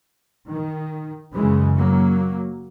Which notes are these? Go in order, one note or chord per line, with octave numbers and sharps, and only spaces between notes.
D#3
F#2 C#3 E3 G#3
F#3 A#3